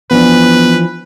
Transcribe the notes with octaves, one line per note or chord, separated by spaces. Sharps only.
E3 F3 B3 D4 B4